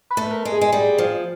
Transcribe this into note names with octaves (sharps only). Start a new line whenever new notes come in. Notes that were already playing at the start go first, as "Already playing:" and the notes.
B4
A3
B4
A#4
G#3
G#4
G#3
G3
F3